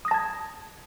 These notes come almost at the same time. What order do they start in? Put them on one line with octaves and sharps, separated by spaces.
D#6 A#6 A5 G#6